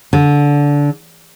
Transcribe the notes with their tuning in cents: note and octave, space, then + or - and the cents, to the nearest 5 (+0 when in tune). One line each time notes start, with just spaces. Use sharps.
D3 -20